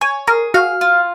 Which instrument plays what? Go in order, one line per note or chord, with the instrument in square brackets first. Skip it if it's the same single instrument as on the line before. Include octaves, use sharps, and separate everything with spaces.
[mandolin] C#5 [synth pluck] G#5
[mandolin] G#4 [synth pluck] A#4
[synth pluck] F#4 [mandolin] F5
[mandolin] F4